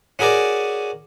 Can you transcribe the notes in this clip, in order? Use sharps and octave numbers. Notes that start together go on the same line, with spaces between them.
C#4 F#4 G#4 A#4 D5